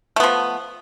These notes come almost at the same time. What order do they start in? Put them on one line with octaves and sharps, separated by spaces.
A3 B3 F3